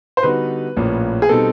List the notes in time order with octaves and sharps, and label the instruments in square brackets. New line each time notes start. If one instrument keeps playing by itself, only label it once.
[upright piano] C5
[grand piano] D3 G3 B3 D#4 F#4 [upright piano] B4
[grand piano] A#1 A2 F3 A#3 C#4
[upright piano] G#4
[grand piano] B2 G3 C4 D#4 [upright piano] A4